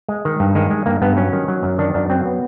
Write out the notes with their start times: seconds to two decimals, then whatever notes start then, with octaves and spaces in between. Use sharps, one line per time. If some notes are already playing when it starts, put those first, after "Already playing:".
0.09 G#3
0.25 D#3
0.40 G2
0.55 D#3 G#3
0.71 G#3
0.86 G2 A#3
1.02 G2 B3
1.17 F#3 C#4
1.33 D#3
1.48 F#3
1.63 F#2
1.78 D#3 D4
1.94 F#2 D4
2.10 F#3 C4
2.26 B3